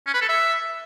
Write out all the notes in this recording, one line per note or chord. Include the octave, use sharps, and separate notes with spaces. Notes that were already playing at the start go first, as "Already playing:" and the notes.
C#4
B4
A4
E5